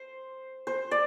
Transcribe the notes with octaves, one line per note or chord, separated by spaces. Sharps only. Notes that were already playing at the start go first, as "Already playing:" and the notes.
Already playing: C5
C5
D5